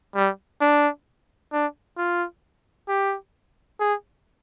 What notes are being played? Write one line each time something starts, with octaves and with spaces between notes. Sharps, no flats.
G3
D4
D4
F4
G4
G#4